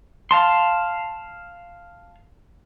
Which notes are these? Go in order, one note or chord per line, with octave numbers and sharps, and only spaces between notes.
F5 A5 C6